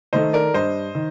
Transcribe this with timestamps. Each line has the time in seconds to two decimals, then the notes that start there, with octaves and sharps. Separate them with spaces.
0.13 D#3 A3 C5 D#5
0.33 A#4 D5
0.53 G2 C5 D#5
0.95 D#3